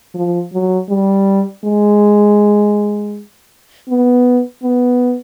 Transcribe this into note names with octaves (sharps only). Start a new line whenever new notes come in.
F3
F#3
G3
G#3
B3
B3